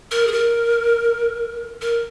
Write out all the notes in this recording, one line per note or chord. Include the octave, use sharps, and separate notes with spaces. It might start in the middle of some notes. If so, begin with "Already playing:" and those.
A#4
G#4
A#4
A#4